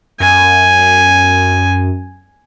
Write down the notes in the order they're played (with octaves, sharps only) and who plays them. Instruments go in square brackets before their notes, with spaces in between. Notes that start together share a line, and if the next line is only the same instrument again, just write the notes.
[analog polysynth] F#2 [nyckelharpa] G#5